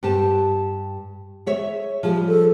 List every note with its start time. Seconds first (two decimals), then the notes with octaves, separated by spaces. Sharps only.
0.03 G2 G4 A5
1.46 G#4 C#5 E5
2.03 F3 G3 G#4
2.28 A4